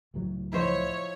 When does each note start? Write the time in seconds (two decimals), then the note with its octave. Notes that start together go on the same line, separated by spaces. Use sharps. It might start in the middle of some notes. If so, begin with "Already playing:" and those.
0.14 C#2 A2 F#3
0.53 F3 E4 C5 C#5 D#5 E5